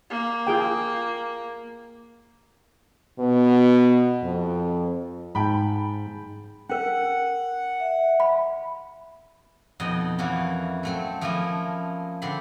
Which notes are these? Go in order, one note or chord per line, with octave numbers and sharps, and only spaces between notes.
A#3
F4 G#4 G5
B2
F2
G#2 G5 A5 B5
C#4 A#4 F#5
E5
B5
F2 B2 D#4 D#5
F2 E3 A#3 C#4 F#4
F#3 A3 C4
F3 A3 A#3 C#4 E4 D#5
D3 C4 D5 B5 C6